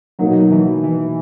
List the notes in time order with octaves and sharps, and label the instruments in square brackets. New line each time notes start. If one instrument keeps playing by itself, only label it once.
[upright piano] B2 A#3 D#4 [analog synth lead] F#3
[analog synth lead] E3
E3